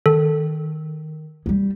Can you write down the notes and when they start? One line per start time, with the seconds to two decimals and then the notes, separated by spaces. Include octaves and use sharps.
0.06 D#3 A4
1.46 G3 G#3